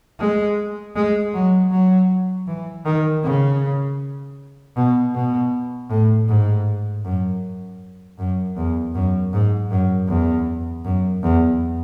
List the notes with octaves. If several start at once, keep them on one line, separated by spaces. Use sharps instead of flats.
G#3
G#3
F#3
F#3
E3
D#3
C#3
B2
B2
A2
G#2
F#2
F#2
E2
F#2
G#2
F#2
E2
F#2
E2